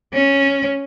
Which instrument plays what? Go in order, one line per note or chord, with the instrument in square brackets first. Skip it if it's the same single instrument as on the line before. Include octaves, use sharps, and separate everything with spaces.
[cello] C#4